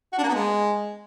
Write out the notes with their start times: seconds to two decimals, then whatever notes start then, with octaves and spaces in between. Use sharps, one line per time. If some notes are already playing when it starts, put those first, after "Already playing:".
0.13 F#4
0.18 D4
0.23 A#3
0.29 B3
0.34 G#3